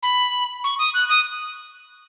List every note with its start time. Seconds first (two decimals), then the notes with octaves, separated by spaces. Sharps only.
0.03 B5
0.64 C#6
0.79 D#6
0.94 F#6
1.09 D#6